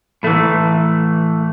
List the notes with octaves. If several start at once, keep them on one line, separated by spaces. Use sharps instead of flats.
A2 E3 A3